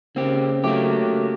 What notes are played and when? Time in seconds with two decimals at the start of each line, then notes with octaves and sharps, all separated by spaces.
0.16 C#3 A#3 C4 G4
0.64 F#3 A3 A#3 G4 D6